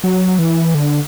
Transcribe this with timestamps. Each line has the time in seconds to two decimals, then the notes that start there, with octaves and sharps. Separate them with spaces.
0.04 F#3
0.39 E3
0.75 D3